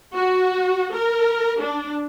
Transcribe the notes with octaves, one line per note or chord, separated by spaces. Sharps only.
F#4
A#4
D4